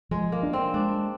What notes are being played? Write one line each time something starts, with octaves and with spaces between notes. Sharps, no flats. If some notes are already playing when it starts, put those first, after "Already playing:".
F3 G#3
A#3
D4
C4
G#3 D4